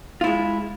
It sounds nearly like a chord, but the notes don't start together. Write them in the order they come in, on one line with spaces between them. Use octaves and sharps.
F4 E4 G#3